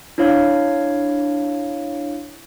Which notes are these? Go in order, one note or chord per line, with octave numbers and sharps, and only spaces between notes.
D4 E4 C#5 F5